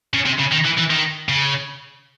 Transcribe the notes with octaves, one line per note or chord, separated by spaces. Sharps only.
C#3
C3
C#3
D#3
E3
E3
D#3
C#3